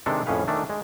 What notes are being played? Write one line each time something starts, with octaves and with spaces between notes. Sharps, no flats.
C3 D#3 G#3 C4 D4 A4
F2 A2 C#4 G#4 B4 F5
D#3 A3 D4
G#3